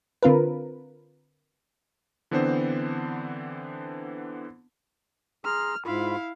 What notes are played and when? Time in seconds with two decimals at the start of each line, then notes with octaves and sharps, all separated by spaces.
0.23 D3 C4 F4 A#4 B4
2.31 D3 E3 B3 C4 D4 C5
5.45 G#4 A#5 C6 F6
5.86 G#2 E4 F4 F5 B5